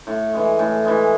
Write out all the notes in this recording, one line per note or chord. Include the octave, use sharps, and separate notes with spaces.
A2
E3 G#3
A2
E3 G#3